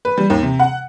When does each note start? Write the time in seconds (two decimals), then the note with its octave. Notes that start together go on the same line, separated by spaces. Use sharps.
0.05 B4
0.18 G3
0.30 D#2
0.43 C3
0.60 F#5